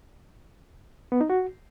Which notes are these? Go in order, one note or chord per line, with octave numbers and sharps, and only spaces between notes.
B3
D#4
F#4